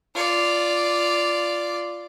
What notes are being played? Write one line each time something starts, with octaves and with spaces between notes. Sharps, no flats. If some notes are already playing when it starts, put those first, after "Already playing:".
F4 D5